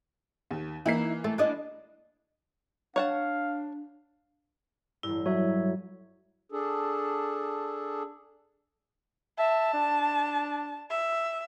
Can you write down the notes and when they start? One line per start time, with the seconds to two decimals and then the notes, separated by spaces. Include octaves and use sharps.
0.51 D#2
0.86 E3 A#3 D#4 E4 C7
1.24 A3
1.38 D4 E4 D#5
2.96 D4 C#5 F5 F#5 A5
5.03 A1 G2 E4
5.26 F#3 C#5 E5
6.52 D4 G#4 A4
9.39 E5 A5
9.74 D4
10.90 E5